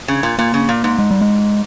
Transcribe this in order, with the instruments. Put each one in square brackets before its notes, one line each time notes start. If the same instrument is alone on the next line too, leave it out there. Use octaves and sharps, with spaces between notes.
[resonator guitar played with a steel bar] C#3
A#2
[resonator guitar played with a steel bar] A#2 [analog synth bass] A#3
[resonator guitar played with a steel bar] C#3
A#2
G#2
[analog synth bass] G#3
G3
G#3